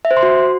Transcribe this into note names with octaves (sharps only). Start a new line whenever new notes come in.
E5
C5
C6
F#4